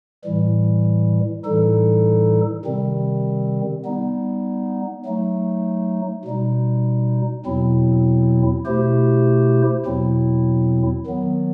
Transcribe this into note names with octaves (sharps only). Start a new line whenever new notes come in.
A2 E3 G3
A2 E3 G3 D#4 A4
C3 D#3 G3 C4
G3 B3 D#4
F#3 A3 D#4
B2 G3 D#4
E2 B2 F#3 C4 E4
B2 A3 E4 G4 C5
E2 B2 F#3 C4 E4
D#3 F#3 B3